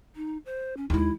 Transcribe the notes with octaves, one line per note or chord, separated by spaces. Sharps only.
D#4
C5
C#4
D#2 G#3 E4